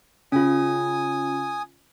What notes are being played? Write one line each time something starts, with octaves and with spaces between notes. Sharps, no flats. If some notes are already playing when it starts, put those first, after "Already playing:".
C#3 C#4 F4 G#5 D#6